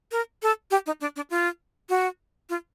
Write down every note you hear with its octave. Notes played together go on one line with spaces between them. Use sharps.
A#4
A4
G4
D#4
D4
D4
F4
F#4
F4